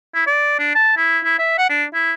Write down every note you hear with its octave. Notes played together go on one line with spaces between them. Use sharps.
E4
D5
D4
A5
E4
E4
E5
F#5
D4
E4